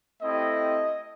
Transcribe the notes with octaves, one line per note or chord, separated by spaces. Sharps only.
A3 C4 E4 G4 D#5